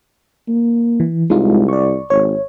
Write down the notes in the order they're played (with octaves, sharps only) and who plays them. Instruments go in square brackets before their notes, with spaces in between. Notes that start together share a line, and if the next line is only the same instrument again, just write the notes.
[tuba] A#3
[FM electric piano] E3
[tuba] C2 [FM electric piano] G#3 D#4 F4
[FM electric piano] D5 C#6
[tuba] G#1 [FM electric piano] C#5